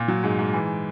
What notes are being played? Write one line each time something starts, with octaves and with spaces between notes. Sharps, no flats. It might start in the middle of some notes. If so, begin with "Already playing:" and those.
Already playing: A#2
F#3
G#2
G#2
E3